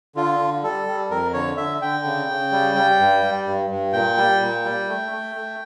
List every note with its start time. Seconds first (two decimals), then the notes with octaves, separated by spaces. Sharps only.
0.16 D3 F4
0.39 D3
0.63 G3 A4
0.87 G3
1.10 F2 A#4
1.34 D3 C#5
1.57 D3 E5
1.82 D3 G5
2.05 C#3
2.29 C#3
2.52 G3
2.75 G3
2.99 G2
3.23 G3
3.47 G2
3.70 G2
3.93 A#2 G5
4.17 G3
4.41 A#2
4.65 G3
4.88 A3
5.12 A3
5.35 A3